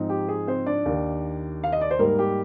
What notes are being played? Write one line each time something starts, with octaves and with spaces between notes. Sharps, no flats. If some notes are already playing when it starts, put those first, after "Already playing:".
Already playing: G#2 F3 C4 D#4
G4
G#4
C4 C5
D4 D5
D#2 D#3 A#3
F5
D#5
D5
C5
G#2 G3 A#3 A#4
G4